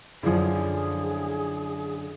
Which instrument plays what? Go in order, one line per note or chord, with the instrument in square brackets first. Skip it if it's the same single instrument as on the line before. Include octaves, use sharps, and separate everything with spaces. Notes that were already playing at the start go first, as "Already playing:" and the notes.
[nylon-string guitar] F#2 D3 [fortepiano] F3 E4 [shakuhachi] G#4